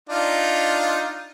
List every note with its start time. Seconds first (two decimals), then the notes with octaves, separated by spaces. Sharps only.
0.09 D4 D#4 F4